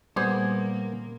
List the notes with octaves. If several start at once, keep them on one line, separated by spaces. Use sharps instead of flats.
A#2 G3 A#3 B3 G#4 C5 G#6